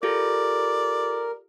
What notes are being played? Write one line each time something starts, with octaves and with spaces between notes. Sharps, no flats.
F4 G4 A4 A#4 D5